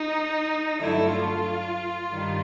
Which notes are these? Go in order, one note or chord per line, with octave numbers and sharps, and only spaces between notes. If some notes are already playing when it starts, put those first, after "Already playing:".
Already playing: D#4
G2 D3 F#3 A3 E4
F4
G2 D#3 G3